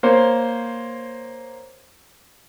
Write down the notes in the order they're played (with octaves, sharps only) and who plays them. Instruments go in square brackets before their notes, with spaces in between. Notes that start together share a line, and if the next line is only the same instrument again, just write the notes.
[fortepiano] A#3 C5 C#5